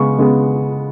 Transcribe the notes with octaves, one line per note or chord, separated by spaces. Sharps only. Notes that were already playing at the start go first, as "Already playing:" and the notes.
Already playing: C#3 G#3 B3 C#6
C#3 G#3 B3